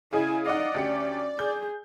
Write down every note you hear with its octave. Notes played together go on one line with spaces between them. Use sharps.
C#3 E4 G#4 D#5 G#5
D#4 D5 D#5 F5 F#5
D2 C#4 G4 C#7
G#4 G6